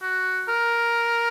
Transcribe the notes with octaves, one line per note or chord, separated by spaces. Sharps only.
F#4
A#4